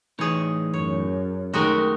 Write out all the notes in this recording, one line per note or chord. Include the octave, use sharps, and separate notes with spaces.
A2 E3 D#4 G#4 C#5
F#2 C#5
D#3 G#3 A3 F#4 G4 A#4